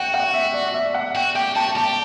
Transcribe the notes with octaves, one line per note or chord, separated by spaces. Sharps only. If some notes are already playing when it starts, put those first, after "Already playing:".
Already playing: F#4 F#5 G5
F#5
E5
D5
E5
F#5
F#4 G5
G4 G5
F#4 A5
G4 A5